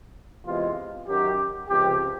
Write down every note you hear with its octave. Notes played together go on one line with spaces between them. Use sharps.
E2 C3 E3 G#3 F4
F#2 D#3 F#3 G4
C#2 C3 F3 G4